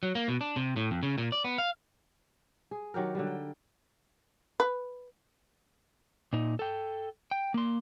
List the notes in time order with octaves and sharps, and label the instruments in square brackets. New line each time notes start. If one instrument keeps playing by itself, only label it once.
[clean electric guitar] F#3
A#3
B2
D4
C3
A2
F2
C#3
A#2
D5
B3
F5
[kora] G#4
D#3 F#3 G4 A#4
D3 F#3 G3
G5
[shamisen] B4
[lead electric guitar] A#2 D#4
A4 G5
G5
A#3 C6